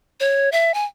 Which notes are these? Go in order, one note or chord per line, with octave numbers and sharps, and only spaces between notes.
C#5
E5
G#5